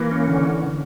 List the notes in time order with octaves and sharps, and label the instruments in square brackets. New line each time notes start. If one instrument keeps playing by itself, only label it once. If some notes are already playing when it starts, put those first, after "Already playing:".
Already playing: [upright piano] E3 [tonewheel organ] A#3
[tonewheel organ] C#4
D3